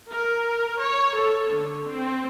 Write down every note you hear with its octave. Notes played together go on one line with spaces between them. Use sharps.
A#4
C#5
A4
D3
C4